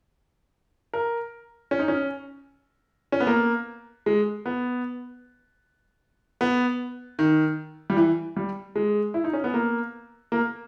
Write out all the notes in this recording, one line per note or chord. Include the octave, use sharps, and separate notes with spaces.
A#4
C#4
D#4
C#4
C#4
B3
A#3
G#3
B3
B3
D#3
G3
E3
G3
G#3
E4
D#4
C#4
B3
A#3
A#3